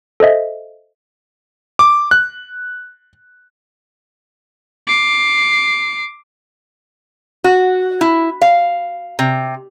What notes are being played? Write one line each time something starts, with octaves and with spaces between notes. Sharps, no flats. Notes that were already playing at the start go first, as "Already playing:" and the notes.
A4 C5 D#5 E5
D6
F#6
D6 C7
F#4
E4
F5
C3